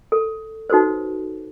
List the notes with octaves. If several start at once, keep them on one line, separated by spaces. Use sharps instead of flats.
A4
D#4 F#4 A4 B4 C5